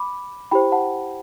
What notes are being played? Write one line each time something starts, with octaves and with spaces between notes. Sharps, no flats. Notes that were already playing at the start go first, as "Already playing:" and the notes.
Already playing: B5 D6
E4 G4 C5 G5 B5
F#5 A5